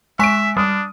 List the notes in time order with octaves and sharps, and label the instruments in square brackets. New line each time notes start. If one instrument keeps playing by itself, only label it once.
[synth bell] G#3 G#5 B6 [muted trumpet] E5 [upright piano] C#6 D7
[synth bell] G3 [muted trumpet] D4 [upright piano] D#6